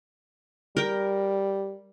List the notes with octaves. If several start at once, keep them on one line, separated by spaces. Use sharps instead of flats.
G3 A#4 G5